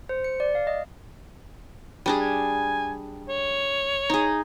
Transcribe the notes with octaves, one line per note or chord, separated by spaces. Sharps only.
C5
C#7
D5
F5
D#5
G3 D4 G#4
G#5
C#5
D#4 G#4